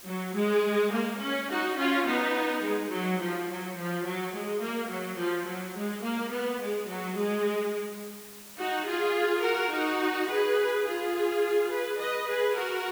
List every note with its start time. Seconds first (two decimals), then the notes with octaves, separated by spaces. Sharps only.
0.08 F#3
0.36 G#3
0.93 A#3
1.21 C#4
1.50 D#4 F#4
1.78 C#4 F4
2.07 B3 D#4
2.64 G#3
2.91 F#3
3.20 F3
3.48 F#3
3.77 F3
4.05 F#3
4.34 G#3
4.62 A#3
4.91 F#3
5.18 F3
5.46 F#3
5.76 G#3
6.03 A#3
6.31 B3
6.61 G#3
6.89 F#3
7.18 G#3
8.59 D#4 F#4
8.87 F4 G#4
9.44 F#4 A#4
9.72 D#4 F#4
10.29 G#4 B4
10.85 F4 G#4
11.71 G#4 B4
11.99 B4 D#5
12.28 G#4 B4
12.56 F#4 A#4